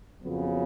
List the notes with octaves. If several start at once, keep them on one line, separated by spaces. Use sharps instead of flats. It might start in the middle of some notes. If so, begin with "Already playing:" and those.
F2 C#3 F#3 B3